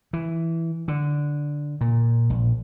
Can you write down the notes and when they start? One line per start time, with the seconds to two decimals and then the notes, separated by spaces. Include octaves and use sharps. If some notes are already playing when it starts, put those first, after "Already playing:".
0.13 E3
0.88 D3
1.81 A#2
2.30 A#1